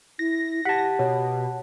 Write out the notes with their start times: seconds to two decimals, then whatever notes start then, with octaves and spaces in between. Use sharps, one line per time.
0.19 E4 A#6
0.65 G4 F#5 A5 B6
0.99 B2 C#5